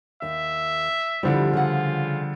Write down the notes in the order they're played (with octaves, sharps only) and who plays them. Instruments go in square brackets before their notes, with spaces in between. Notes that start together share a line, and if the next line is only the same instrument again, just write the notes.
[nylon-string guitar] D#2 [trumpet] E5
[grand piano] D3 F3 G3 [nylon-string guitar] E4 G4
[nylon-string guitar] C#3 F#5 [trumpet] F4